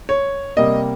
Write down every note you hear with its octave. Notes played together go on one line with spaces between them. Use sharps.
C#5
C3 G3 A#3 D#5